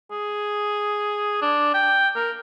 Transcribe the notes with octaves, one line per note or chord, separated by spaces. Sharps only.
G#4
D4
G5
A#4